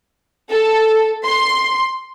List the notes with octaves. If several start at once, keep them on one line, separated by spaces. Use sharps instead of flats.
A4
C6